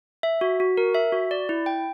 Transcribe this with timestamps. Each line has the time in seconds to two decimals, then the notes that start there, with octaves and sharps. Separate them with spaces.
0.23 E5
0.41 F#4
0.60 F#4
0.77 A#4
0.95 E5
1.12 F#4
1.31 D5
1.49 E4
1.66 G5